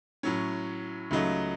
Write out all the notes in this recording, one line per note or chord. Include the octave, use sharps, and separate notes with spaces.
A2 F#3 C#4
C#2 C#3 F#3 A3 D#4